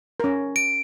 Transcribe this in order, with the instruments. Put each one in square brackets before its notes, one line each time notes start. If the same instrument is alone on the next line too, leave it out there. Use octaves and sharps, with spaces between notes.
[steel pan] C#4 A#4
[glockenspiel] D7